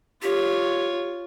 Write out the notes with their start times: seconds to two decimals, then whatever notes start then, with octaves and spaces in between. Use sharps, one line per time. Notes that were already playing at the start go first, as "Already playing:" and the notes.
0.22 F4 G4 C#5